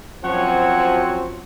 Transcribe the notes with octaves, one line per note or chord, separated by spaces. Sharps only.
F#2 F3 F#3 C4 C#5 F#5 G#5